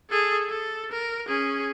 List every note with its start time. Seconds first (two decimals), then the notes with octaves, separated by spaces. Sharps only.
0.10 G#4 A4
0.49 A4
0.92 A#4
1.28 C#4 G#4